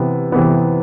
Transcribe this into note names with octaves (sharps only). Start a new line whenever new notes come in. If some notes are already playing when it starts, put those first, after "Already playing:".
Already playing: C3 E3 B3
C3 E3 B3